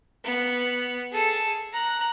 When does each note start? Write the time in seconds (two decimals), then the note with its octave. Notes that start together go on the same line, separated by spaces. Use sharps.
0.24 B3
1.12 G#4 A4
1.73 A#5 F#6